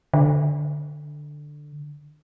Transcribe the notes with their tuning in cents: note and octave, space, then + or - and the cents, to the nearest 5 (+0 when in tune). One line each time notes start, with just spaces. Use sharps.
D3 +10